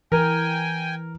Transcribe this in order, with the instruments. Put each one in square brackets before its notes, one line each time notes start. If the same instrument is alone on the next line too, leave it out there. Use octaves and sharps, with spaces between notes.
[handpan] E3 [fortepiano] A#4 [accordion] G5 G#5